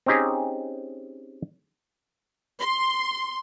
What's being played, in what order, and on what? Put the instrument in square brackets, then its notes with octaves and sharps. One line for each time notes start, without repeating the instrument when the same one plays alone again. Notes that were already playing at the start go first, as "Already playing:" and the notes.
[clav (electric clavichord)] C4 C#4 D#4 G4 G#4
[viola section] C6